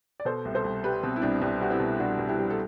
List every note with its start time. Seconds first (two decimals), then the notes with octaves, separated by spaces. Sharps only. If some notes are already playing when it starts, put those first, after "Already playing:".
0.20 D5
0.25 B2 A4 C5
0.45 C2
0.55 A4 C5
0.65 C2
0.84 G3 G4 B4
1.03 B2 C4
1.16 E4
1.22 C2 D4
1.42 C2 D4
1.60 G3 F#4
1.70 C4 E4
1.80 B2
1.99 C2 D4 F#4
2.19 C2
2.29 E4 G4
2.38 G3
2.50 A4